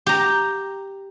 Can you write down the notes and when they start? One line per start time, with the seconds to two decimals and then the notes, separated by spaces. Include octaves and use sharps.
0.06 G4 A#5